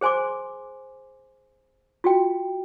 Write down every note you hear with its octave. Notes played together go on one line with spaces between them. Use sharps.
G#4 C5 G#5 C6 D6
F4 F#4 G5